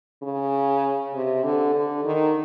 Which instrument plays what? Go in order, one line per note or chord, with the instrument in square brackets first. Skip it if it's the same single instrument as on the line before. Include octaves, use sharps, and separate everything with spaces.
[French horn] C#3
C3
D3
D3
D#3